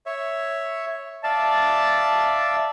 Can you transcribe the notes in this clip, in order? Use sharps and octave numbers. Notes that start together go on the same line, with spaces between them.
C#5 E5
D5 E5 F5 A5